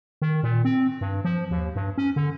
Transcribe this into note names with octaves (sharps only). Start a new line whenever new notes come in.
D#3
A#2
C4
G2
F3
D#2
G2
C#4
D3